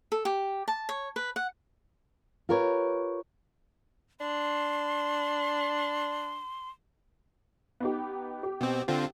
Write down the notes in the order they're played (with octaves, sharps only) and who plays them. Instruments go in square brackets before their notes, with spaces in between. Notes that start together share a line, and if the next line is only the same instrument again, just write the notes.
[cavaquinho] A4
G4
A5
C#5
B4
F#5
[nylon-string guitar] F4 G4 A#4 B4 C#5
[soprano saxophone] D4 [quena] C6
[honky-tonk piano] B3 D#4 G4
G4
[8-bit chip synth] B2 C4
D3 C4 F4